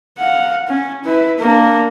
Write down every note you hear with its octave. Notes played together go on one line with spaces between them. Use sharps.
F5 F#5
C#4
E4 B4
A#3 D4